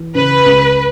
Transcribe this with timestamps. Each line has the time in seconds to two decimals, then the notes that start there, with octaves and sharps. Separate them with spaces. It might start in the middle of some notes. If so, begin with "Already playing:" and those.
Already playing: E3
0.15 C#3 B4
0.46 C#2